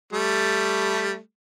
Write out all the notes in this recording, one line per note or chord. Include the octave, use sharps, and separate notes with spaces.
G3 A3